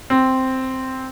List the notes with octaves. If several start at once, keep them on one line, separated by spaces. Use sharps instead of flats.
C4